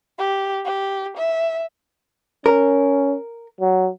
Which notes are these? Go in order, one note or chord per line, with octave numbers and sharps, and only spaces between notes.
G4
G4
E5
C#4 A#4
F#3